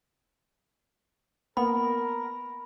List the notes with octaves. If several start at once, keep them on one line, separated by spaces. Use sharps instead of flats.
A#3 B3 A#4 B5